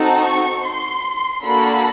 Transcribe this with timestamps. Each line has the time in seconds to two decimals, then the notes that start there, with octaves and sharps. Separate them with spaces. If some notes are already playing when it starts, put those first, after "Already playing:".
Already playing: C4 D#4 F#4 A4
0.22 C#6
0.63 C6
1.43 A#3 D4 F#4 A4 B5